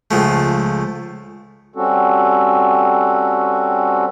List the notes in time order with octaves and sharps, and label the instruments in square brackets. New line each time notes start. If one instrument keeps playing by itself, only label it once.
[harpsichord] C#2 F3 A3
[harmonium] G3 C4 C#4 F#4 A4